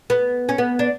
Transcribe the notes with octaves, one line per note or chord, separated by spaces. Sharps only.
B3
C#4
B3
D4